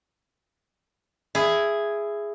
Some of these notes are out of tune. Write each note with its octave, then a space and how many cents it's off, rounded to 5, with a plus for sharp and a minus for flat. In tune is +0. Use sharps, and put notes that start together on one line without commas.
E4 +15 G#4 +0